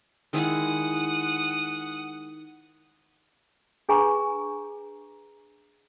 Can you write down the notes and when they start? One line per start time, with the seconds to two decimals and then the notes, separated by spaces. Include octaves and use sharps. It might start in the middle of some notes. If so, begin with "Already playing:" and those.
0.33 D#3 G#3 E4 F#5 D#6
3.89 D4 G#4 B4 G#5 A#5 C#6